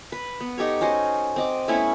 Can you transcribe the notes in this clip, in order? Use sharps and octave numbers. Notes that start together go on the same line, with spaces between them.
B4
B3
D#4 G4 A4 C#5
C#4 F#4 C5 D#5
C4 D#5 D6
A3 B3 C#4 E4